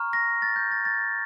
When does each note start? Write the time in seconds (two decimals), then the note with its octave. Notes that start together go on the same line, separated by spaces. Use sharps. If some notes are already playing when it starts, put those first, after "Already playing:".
Already playing: A#5 C#6 F6
0.13 A#6
0.42 A6
0.56 G6
0.71 A6
0.85 A6